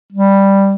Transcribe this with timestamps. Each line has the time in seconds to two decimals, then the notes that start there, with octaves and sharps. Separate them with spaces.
0.13 G3